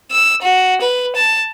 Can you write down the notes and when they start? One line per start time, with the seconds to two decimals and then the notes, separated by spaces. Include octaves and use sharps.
0.11 E6
0.42 F#4
0.81 B4
1.16 A5